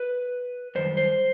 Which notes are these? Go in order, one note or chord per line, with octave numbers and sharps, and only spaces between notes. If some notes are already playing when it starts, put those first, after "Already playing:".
Already playing: B4
F#2 D#3 G3 C5
C5